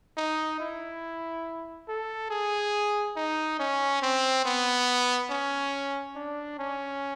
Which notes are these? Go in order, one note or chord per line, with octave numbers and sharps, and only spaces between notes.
D#4
E4
A4
G#4
D#4
C#4
C4
B3
C#4
D4
C#4